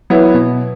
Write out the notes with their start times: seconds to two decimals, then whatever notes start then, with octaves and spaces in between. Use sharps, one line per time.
0.10 F#3 B3 E4
0.34 B2